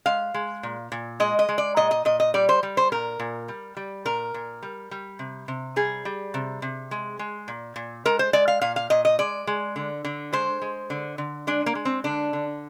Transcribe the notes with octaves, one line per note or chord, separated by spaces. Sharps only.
G#3 F5
G#3
A#2
A#2
G#3 D#5
D#5
G#3
D5
A#2 D#5
D#5
A#2 D#5
D#5
G3 D5
C5
G3
C5
A#2 A#4
A#2
G3
G3
A#2 A#4
A#2
G3
G3
C3
C3
G3 G#4
G3
C3
C3
G#3
G#3
A#2
A#2
G#3 A#4
C5
G#3 D5
F5
A#2 F5
F5
A#2 D#5
D#5
G#3 D5
G#3
D3
D3
G#3 C5
G#3
D3
D3
G#3 D4
A#3
G#3
C4
D3 D4
D3